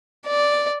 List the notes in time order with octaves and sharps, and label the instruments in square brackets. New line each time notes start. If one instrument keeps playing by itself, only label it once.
[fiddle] D5